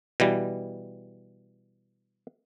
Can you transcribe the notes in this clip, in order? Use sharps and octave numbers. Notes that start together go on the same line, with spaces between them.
B2 E3 G3